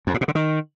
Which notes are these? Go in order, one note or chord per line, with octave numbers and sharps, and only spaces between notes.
F2
A2
B2
D3
D#3